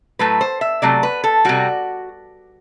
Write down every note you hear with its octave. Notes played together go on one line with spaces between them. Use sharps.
A2 F#3 A3 B4
C5
E5
C3 F#3 A3 D5
B4
A4
C3 G3 F#4